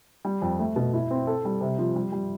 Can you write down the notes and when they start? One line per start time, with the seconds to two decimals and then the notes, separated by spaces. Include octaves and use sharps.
0.25 G3
0.42 F2
0.59 A3
0.76 B2
0.93 E4
1.11 C4
1.27 A4
1.45 G3
1.61 C3
1.78 F3
1.96 G3
2.12 G3